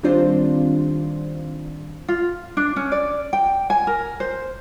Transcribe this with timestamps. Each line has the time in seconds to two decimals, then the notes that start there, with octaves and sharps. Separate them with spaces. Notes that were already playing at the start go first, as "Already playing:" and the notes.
0.03 D#3 G3 C4 D4 F4 C5
2.08 F4
2.57 D4
2.76 C#4
2.92 D5
3.33 G5
3.70 G#5
3.87 A#4
4.20 C5